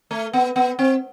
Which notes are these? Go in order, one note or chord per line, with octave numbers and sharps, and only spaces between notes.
A3
B3
B3
C4